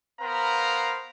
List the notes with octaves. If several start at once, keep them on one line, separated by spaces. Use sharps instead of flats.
B3 A#4 C5 F5 A#5 B5